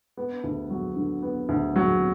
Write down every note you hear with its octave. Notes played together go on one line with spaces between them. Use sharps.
B3
D2
F#3
D3
B3
D2
F#3